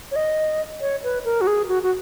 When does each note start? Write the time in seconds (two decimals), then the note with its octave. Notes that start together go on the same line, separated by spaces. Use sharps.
0.12 C#5
0.16 D#5
0.81 C#5
1.04 B4
1.25 A#4
1.41 F#4
1.47 G#4
1.68 F#4
1.83 F#4